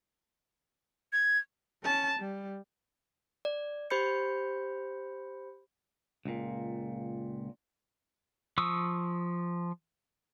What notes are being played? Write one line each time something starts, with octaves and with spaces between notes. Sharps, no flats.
G#6
C#4 A5
G3
D5
G4 C5 B5 G6 C#7
C#2 A#2
F3 C#6 D#6 E6